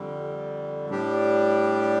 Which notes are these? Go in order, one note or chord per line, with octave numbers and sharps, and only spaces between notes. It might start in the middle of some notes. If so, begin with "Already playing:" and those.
Already playing: F2 D3 G3
A2 G3 D4 G4